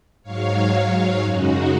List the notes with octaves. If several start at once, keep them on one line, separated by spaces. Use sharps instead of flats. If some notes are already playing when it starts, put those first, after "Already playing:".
G#2 F#3 C#5 F5
C#5 F5
F#2 C#3 G#3 D#4 F#4